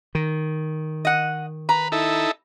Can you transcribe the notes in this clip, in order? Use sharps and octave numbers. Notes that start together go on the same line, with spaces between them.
D#3
D#5 F#5
B4 A#5
D#4 E4 A4